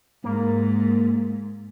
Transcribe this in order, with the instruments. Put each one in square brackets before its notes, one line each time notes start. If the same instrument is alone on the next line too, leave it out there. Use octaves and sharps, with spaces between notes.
[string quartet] G#2 [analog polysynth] A#3